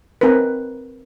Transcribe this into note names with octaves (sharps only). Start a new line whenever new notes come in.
C4 D#4 A#4 B4